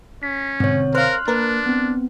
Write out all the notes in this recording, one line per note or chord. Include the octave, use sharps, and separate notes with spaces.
C#4 B6
G#2 B2 D3 C4 C#5
A#4 C5 F5 C6 F6 F#6
A#3 D4 A#4 B4
B3 C4